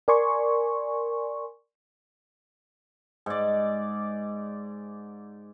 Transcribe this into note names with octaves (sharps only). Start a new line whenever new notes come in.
A#4 D5 G#5 C6 C#6
G#2 D5